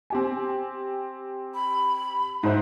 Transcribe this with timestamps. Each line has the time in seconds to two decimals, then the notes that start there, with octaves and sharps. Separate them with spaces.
0.10 C4 G4 G#5
1.55 B5
2.43 G#2 C5 E5 F#5